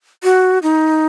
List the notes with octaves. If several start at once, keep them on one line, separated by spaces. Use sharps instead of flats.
F#4
D#4